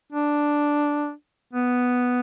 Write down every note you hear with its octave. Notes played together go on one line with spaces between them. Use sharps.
D4
B3